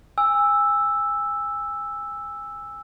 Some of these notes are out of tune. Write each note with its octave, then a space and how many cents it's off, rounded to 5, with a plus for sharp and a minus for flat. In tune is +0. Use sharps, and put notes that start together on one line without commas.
G#5 -25 E6 +0